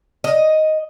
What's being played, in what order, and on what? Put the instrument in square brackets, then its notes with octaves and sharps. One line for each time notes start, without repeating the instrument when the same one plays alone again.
[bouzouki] D#5